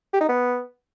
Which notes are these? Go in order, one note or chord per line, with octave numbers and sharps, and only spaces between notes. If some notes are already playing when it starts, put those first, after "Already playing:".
G4
D#4
B3